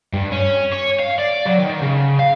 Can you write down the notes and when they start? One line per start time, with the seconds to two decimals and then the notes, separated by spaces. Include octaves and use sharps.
0.13 G2
0.32 C#4
0.73 C#5
0.99 F5
1.19 D5
1.47 F#3
1.59 D#3
1.82 C#3
2.19 F5